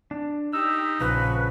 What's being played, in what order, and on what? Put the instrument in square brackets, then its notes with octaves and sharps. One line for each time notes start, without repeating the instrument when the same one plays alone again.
[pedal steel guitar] D4
[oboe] D#4 [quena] G4 [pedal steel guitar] E6
[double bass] A#1 [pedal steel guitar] C#3 F3 F#4 [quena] B4